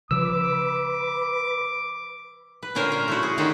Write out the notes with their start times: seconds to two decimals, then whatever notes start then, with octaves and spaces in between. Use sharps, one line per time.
0.11 C#3 F3 B4 D6 E6
2.63 B4
2.75 A#2 D3 C#4 A#4 C5 G#5
2.92 A#4
3.08 A3 E4 F#4
3.23 G#4
3.38 D3 D#3 C#4 F#4 G4 A4